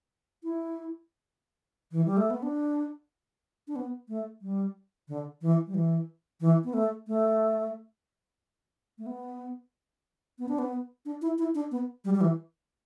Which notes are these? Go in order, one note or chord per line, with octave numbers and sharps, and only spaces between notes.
E4
E3
G3
A3
B3
D4
D4
B3
A3
G3
D3
E3
G3
E3
E3
B3
A3
A3
A3
B3
B3
D4
B3
D4
E4
E4
D4
B3
G3
G3
E3